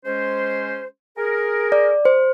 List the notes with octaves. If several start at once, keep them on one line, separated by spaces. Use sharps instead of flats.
G#3 C#4 C5
G#4 A#4
D5
C5